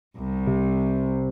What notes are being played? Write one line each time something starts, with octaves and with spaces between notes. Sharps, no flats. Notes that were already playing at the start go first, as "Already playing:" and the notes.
C2
C3